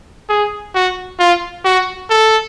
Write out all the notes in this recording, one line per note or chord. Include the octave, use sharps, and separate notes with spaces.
G#4
F#4
F4
F#4
A4